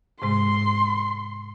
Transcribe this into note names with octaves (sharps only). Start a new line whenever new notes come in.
G#2 C3 G#3 C6